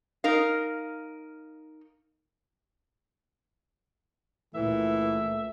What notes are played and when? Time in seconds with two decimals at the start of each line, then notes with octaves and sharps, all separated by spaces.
0.24 D#4 A#4 F5
4.55 C#2 A#2 E3 A3 E5